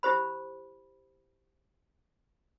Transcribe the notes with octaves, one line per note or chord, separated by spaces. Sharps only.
E4 G4 C5 B5